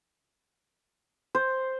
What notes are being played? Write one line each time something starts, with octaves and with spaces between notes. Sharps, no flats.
C5